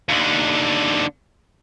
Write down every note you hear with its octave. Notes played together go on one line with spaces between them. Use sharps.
D#2 D3